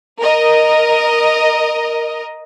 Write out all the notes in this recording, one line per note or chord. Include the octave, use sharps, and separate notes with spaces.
A#4 D#5